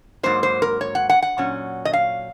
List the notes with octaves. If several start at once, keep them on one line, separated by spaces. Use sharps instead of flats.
G#2 F#3 A#3 C5
C5
A#4
C#5
F#5
F#5
F#5
A#2 F#3 C#4
D#5
F5